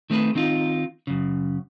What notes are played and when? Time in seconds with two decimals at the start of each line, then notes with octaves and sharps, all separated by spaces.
0.10 D#3 A3 C4 G#4 B4
0.35 D#3 C4 D#4 F4
1.07 F#2 C#3